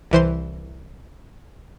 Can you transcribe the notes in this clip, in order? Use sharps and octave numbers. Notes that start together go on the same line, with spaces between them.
C2 E3 C5 C6